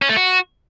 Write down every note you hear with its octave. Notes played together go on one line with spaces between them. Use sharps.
C#4
A3
F#4